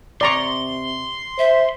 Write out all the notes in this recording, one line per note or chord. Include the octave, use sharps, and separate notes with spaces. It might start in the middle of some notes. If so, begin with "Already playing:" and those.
C3 D5 A#5 C6 C#6
C5 E5